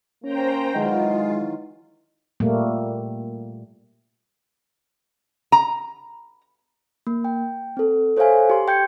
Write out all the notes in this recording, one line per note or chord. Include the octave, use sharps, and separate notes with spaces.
A#3 C#4 C5 G5 A#5
D#3 E3 F#3 G#3 F4
A#2 G3 A3 A#3
A#5
A#3
G5
C4 A4
A4 C5 C#5 E5 F5 G#5
G4 C6
G5 G6 G#6 C#7